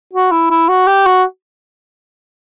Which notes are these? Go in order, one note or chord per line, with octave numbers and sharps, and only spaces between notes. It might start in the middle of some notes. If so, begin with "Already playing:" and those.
F#4
E4
E4
F#4
G4
F#4